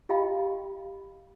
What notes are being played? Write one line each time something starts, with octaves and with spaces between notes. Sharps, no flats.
F4 G4 D#5 F5 G5 B5